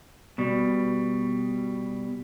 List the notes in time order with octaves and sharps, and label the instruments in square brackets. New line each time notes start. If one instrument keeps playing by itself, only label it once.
[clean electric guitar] B2 G3